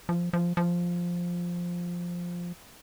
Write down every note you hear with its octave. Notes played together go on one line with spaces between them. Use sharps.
F3
F3
F3